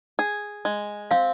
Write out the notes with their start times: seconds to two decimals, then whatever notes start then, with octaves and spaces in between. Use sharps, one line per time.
0.19 G#4
0.65 G#3
1.11 C4 F5